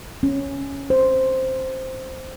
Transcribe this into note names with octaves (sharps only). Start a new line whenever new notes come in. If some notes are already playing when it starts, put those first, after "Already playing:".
C#4
C5